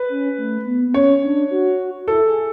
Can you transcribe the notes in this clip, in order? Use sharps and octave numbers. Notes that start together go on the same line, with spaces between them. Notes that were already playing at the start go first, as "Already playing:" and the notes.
Already playing: B4
C#4
A3
B3
B3
C#4 C#5
D4
F#4
E4 A4
G#4